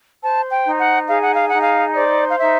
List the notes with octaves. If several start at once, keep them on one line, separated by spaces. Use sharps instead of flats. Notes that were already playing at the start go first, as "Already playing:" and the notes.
C5 A5
G5
D#4
F#5
G#4 F5
F#5
F5
D#4 F#5
F5
C5 D5
F5
D#4 E5